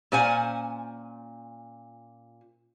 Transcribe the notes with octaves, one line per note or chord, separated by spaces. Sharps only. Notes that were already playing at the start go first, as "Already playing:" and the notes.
A#2 C#4 C5 F#5 G#5